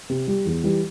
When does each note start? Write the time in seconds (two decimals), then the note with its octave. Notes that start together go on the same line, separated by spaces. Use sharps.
0.09 C3
0.27 G3
0.45 E2
0.64 E3 G3